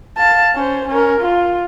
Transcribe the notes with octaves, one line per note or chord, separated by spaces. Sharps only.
F5 A5
C#4 C5
C#4 A#4
F4